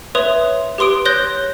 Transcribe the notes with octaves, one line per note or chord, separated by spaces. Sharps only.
B4 C#5 E5 C6 D#6 F7
G4 B4 C6 D#6 D7
C#5 F#6 G6 A#6 G7